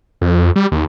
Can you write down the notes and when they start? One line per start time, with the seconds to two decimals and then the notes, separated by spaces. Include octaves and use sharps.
0.22 F2
0.56 G3
0.72 D#2